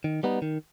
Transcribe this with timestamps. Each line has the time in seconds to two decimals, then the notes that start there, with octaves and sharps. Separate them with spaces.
0.04 D#3
0.23 G3 B3 D#4
0.42 D#3